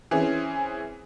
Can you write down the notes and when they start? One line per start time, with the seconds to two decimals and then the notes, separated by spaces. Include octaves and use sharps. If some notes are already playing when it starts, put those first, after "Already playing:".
0.11 E3 C4 C#4 G#4